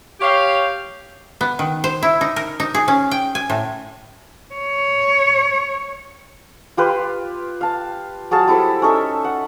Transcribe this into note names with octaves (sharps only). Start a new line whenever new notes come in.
G4 C#5 F5
B3
D#3
C5
E4
D#4
A#4
D#4
G#4
C#4
G5
G#5
A2
C#5
F4 G4 B4 C6
F5 A5
F#3 G#4 F5 A5
G3 E4 A4 C5
C#4 D#4 A4 E5
F#5